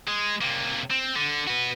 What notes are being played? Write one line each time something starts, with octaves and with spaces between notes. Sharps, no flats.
G#3
C3 A#3
C4
D3
F#4 B4